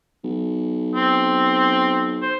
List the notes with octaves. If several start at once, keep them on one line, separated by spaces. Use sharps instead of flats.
B1
C4
C5